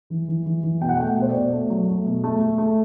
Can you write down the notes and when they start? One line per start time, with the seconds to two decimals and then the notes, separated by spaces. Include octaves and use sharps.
0.10 E3
0.28 E3
0.46 E3
0.63 E3
0.81 B2 G5
0.89 F#5
0.97 A3 G5
1.17 B2
1.22 C5
1.29 D5
1.35 B2
1.52 A3
1.70 F#3
1.88 A3
2.06 B2
2.24 A3
2.40 A3
2.58 A3